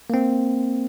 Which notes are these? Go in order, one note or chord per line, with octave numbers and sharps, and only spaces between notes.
A#3 C4